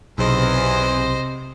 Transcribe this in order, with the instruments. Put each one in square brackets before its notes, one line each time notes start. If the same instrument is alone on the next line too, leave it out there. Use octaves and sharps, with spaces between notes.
[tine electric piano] B1 [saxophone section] E2 [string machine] C3 [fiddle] C5 D#5